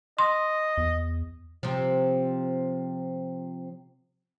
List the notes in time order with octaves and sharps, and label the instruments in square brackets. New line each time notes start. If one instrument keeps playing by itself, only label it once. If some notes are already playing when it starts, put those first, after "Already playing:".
[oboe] D#5 [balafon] C6
[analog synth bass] E2
[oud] C3 F3